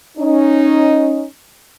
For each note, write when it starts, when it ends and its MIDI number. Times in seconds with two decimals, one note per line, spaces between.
0.18 1.24 61
0.18 1.24 63